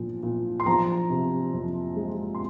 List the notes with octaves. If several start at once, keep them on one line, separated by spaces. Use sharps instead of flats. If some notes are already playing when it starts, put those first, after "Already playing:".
Already playing: A#2 F3
A#2
C6
F3 A#5
C3
F2
G#3
C6